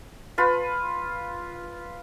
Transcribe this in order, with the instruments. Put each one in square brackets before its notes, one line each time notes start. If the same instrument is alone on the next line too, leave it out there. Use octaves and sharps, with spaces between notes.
[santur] F4 B4